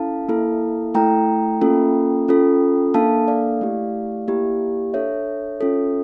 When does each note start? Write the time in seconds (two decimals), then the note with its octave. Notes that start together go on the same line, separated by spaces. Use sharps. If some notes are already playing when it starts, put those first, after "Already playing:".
Already playing: C#4 E4 A4 F5 A5
0.28 A#3 E4 A4
0.94 A3 E4 A4 G5 A#5
1.61 A#3 C#4 F4 A4
2.28 C#4 F4 A4
2.94 A#3 D4 A4 F5 A5
3.28 D5 F5
3.61 A3 E4 G4
4.28 A#3 E4 G4
4.94 D4 A4 C#5 E5
5.61 C#4 F4 A4